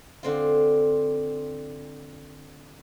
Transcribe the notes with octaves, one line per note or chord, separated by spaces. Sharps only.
D3 C4 F4